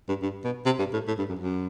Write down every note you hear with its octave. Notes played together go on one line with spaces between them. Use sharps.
G2
G2
B2
C3
G2
A2
A2
G2
F#2
F#2